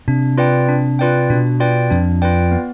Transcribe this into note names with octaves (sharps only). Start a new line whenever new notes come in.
C3 D4
F4 B4 D5 G5
D4
F4 B4 D5 G5
B2 D4
F4 B4 D5 G5
F2 D4
F4 B4 D5 G5
B3